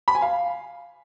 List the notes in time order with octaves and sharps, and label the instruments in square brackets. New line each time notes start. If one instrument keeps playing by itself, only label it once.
[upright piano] B5
G#5
F5